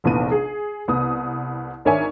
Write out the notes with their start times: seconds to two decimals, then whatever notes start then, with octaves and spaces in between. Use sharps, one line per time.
0.04 F1 A#1 E3 B3 D#7
0.31 G#4
0.88 C2 B3 D#6
1.85 G#1 D4 A#4 C#5 E5 G#5